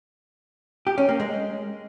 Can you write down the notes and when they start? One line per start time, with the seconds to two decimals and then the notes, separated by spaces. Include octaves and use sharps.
0.87 G4
0.98 C#4
1.09 A#3
1.20 G#3